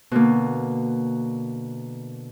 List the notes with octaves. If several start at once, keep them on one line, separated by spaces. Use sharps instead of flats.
B2 D3 A#3